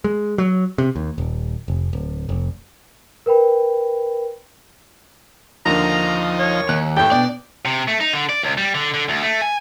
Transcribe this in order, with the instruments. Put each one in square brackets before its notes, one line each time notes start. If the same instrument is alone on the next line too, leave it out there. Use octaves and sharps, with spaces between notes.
[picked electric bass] G#3
F#3
C3
D#2
D#1
F1
D1
F1
[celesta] A#4 B4 G5 B5
[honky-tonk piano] D#2 D3 [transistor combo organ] F3 D#4 [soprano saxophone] A#5
[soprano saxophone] C#5
[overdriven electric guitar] D#2 [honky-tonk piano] F#6
[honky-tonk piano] A1 A2 [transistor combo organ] A3 [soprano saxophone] G5
[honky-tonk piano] B2 [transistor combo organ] D4 [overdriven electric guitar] D5
[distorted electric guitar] C3
A3
D#4
D3
D5
C#2
G3
D3
D3
D2
A3
G#5